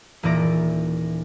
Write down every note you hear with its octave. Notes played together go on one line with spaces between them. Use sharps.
D#1 A#2 E3 D5 A#6 D7